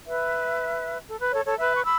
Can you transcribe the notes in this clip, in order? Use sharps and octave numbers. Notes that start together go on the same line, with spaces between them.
B4 E5
A4
B4
A4 C#5
A4 C#5
B4 E5
C#6
B5 E6